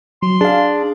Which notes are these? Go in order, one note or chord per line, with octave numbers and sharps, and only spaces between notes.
F#3 C6
D4 G#4 F5